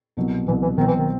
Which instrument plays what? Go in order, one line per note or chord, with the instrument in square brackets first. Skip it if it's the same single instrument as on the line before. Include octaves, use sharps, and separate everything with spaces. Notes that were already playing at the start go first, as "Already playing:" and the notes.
[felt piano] C2 B2 F#3
[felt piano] C2 B2 F#3 [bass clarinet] E3
[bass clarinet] E3
[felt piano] C2 B2 F#3 C4 [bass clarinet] D#3
[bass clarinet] E3
D#3